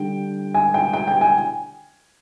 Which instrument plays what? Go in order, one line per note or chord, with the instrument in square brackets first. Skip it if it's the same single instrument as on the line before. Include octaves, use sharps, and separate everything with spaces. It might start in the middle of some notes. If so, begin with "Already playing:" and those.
Already playing: [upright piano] D3 G3 G5
G#5
G5
G5
G5
G#5